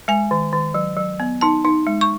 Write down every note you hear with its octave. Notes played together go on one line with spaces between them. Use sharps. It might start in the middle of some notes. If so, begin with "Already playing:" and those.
G#3 G#5
D#3
D#3
F#3
F#3
B3
D#4 A5
D#4
G#3
C#6